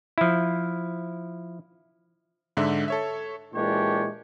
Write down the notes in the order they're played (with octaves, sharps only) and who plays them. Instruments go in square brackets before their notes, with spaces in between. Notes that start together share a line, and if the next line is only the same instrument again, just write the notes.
[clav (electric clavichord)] F3 E4
[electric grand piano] G#2 D3 E5
A4 C#5 E5
[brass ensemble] A#2 E3 G#3 D4 G4 C#5